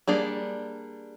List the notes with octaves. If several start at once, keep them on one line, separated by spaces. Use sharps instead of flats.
G3 A#3 D4 G#4